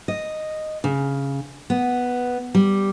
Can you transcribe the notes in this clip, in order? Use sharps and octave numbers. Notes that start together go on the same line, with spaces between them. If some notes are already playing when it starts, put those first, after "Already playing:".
D#5
C#3
B3
G3